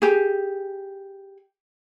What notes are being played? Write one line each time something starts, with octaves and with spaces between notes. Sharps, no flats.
G4 G#4